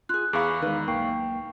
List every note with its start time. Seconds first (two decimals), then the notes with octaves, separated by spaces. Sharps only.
0.09 F4 G#4 F#6
0.33 E2 G#4 F5 B5 C#6 D6
0.62 D#3 G#3 D#4 B4 D5
0.88 B1 A#3 G5 C#6 C7